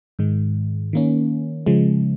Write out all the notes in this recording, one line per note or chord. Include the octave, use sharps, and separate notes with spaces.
G#2 D#3 G#3
D#3 A#3 C#4
C#3 F3 G#3